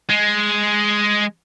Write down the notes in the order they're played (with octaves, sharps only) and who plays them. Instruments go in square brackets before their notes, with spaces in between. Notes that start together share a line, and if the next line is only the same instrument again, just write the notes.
[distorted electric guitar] G#3